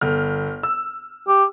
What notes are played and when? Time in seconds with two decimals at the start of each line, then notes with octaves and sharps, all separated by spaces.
0.01 G1 F6
0.63 E6
1.28 G4